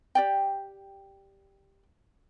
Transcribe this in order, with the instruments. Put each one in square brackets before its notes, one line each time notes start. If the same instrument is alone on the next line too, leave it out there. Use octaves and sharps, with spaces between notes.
[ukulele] G4 D5 G5